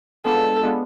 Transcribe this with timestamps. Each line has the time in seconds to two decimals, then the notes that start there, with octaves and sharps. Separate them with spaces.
0.25 G#3 B3 D4 F4 A4
0.63 G#3 B3 D4 F4